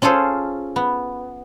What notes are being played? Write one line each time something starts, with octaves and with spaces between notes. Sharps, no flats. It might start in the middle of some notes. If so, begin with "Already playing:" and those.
C#4 F4 G#4 A4 C5
B3